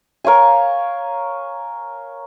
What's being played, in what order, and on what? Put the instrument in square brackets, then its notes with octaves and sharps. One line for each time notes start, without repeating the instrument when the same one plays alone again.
[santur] A#4 C#5 F5 G#5